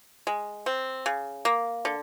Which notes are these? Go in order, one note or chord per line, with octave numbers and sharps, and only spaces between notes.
G#3
C4
C#3
A#3
D3